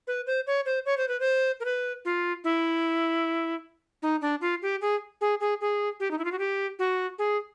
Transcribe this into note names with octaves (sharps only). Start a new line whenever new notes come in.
B4
C5
C#5
C5
C#5
C5
B4
C5
A#4
B4
F4
E4
D#4
D4
F4
G4
G#4
G#4
G#4
G#4
G4
D#4
E4
F4
F#4
G4
F#4
G#4